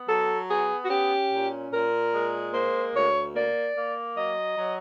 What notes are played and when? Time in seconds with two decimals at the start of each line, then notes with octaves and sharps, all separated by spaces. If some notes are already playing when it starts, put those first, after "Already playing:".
Already playing: B3
0.08 F#3 A4
0.49 B3 G#4
0.84 F#4
0.89 C#4 G4
1.31 A#2
1.71 A#2 A#4
2.12 G#3
2.53 A#3 C5
2.94 D2 C#5
3.34 A#3 D5
3.75 A#3
4.16 F#3 D#5
4.57 F#3